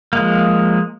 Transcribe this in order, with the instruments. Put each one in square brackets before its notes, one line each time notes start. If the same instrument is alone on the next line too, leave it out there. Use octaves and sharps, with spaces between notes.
[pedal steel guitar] F3 G#3 A#3